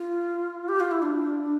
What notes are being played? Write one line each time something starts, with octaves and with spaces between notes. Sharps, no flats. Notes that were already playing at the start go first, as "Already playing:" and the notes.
Already playing: F4
G4
F4
E4
D4